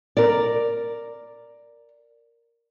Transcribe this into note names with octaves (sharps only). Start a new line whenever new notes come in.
A#4 D5